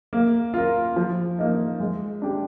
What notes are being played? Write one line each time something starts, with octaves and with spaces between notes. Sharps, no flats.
A#3
F4 A#4
F3
A#3 D#4
G#3
D4 G4